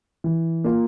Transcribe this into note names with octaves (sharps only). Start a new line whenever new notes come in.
E3
A#3 F4